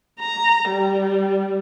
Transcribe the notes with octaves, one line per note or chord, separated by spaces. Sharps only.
A#5
G3